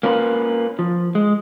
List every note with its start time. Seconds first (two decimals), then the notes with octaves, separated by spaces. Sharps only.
0.03 A#3 C#4 F4 A#4 B4
0.79 F3
1.15 G#3